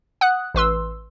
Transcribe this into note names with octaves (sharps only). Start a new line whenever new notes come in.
F#5 D#6 F#6
A1 B4 C6 E6